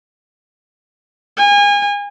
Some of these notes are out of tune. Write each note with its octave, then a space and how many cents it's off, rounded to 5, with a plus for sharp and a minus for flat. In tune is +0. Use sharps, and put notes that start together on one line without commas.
G#5 -30